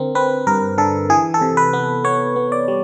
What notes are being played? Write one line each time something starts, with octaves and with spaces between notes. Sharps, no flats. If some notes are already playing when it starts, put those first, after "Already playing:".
Already playing: D3 C4 A#4
C4 B4
G2 A#4
D3 A4
E3 G#4
A4
C3
B4
B3
B3 C#5
B3
D5
G3